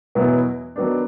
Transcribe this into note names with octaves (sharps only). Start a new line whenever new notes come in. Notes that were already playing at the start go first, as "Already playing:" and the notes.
E2 B2 F#3 B3 E4
D#3 F#3 B3 D4